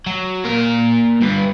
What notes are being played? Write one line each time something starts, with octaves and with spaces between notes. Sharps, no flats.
F#3
A#2 A#4
G2 B3